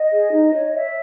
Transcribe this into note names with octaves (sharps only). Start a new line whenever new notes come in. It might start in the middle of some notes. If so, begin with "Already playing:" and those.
Already playing: D#5
G#4
D#4
C#5
C#5 E5